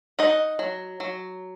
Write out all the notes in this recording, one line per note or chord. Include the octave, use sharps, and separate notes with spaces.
D#4 D#5 F#5
F#3
F#3